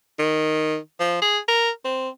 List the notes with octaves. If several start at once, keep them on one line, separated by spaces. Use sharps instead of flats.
D#3
F3
G#4
A#4
C4